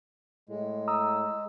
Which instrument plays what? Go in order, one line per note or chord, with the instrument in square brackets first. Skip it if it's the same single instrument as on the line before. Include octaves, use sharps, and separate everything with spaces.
[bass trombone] A2 [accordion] G#3
[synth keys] A#5 D#6 E6